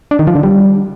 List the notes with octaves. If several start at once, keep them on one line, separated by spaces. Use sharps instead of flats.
D4
D#3
F3
D3
G3